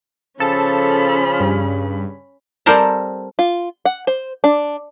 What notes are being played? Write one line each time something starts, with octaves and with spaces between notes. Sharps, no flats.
C#3 F3 C#4 A4 B5
G2
G3 C4 A4 A#4 C5 A5
F4
F#5
C5
D4